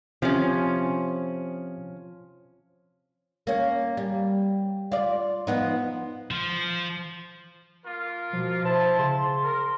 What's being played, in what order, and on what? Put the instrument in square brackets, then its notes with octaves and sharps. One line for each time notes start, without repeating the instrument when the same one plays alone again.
[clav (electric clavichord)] C3 [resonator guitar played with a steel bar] F3 C#4
[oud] A#3 C#4
G3
F4 D5
F3 B3 D#4
[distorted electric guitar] F3
[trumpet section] A#3 F4 A#4
[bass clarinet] B2 [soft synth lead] F3
[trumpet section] E4 A5 [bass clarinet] C5
[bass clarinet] C#3 [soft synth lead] C6
[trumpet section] A#4